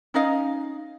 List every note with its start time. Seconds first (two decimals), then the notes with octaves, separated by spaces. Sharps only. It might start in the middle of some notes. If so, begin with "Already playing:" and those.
0.14 C#4 D#4 D#5 F5